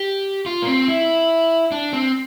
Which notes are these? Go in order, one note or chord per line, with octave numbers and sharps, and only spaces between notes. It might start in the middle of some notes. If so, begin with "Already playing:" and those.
Already playing: G4
F4
A#3
C4
E4
D4
C4